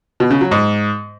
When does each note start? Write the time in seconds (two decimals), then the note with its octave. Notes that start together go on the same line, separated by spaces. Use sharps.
0.20 B2
0.31 C#3
0.41 F#3
0.51 G#2